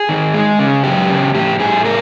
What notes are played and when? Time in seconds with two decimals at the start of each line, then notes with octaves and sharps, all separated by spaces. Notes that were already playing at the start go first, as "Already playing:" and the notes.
Already playing: G#4
0.09 D#3
0.34 G#3
0.59 C#3
0.84 F#2 G4
1.09 C#3
1.34 A2 G4
1.59 A2 G#4
1.85 A3 A#4